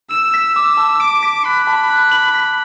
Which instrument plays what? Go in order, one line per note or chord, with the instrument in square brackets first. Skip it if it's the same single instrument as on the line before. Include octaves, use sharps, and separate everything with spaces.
[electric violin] E6 [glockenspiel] E7
[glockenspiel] B6
D6
A5
[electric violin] D6 [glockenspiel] D7
[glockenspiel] B6
[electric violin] B5 [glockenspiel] F#6
[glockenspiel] A5
F#6
F#7
B6